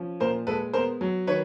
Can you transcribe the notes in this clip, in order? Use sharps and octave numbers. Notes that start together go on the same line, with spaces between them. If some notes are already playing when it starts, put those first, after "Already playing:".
Already playing: F3 C#4
A#2 A#4 C5
G#3 A4 B4
B3 A#4 C5
F#3
D#3 B4 C#5